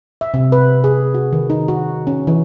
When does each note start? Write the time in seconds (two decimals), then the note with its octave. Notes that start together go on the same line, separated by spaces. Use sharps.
0.21 E5
0.34 C3
0.52 B4
0.84 G#4
1.14 F#4
1.33 D#3
1.50 D#4
1.68 F#4
2.07 C#4
2.27 E3